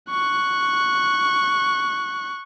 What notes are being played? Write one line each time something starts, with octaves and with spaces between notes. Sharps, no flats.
C#6 F#6